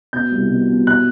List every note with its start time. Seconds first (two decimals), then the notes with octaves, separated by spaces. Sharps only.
0.13 B2 G6
0.32 C2
0.50 B2
0.69 B2
0.87 F#6